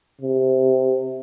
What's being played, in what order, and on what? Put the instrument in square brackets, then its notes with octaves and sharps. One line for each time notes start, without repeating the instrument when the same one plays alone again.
[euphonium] C3